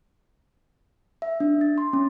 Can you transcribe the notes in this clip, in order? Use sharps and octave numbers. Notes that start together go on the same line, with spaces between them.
E5
D4
A6
C6
C#4